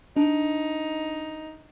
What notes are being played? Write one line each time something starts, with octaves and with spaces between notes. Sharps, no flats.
D4 D#4